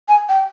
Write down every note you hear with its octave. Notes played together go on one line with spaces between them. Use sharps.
G#5
G5